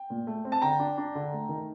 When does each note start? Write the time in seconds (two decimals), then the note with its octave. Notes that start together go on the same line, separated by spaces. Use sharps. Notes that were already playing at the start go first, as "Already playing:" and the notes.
Already playing: G5
0.10 A#2
0.27 A3
0.45 C4
0.52 A5
0.62 D3 G5 A#5
0.79 D4
0.98 D4
1.15 D3
1.33 A3
1.49 D#3